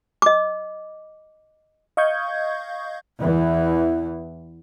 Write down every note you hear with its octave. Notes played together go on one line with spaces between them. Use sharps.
D#5 D6
D#5 F5 C#6 D#6 G6 G#6
E2 E3